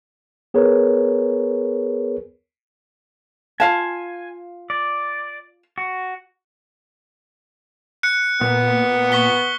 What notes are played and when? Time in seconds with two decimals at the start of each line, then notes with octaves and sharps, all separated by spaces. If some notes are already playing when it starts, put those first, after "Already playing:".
0.54 B3 G#4 A#4 B4 C#5
3.60 F4 F5 G#5 A5
4.70 D5
5.78 F#4
8.03 F#6 C#7
8.41 A#2 B3
9.12 C#6 B6 G7